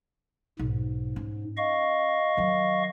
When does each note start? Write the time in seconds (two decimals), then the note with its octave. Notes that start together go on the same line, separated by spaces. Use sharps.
0.59 B1 G#2
1.16 C#4
1.57 D#5 F5 C#6
2.37 D#3 F#3